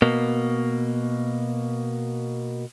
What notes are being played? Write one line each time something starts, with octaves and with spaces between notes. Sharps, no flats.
B2 A#3